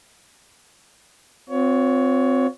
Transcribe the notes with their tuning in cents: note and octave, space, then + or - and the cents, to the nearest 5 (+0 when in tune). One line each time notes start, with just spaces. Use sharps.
C4 -15 F4 +40 C#5 +20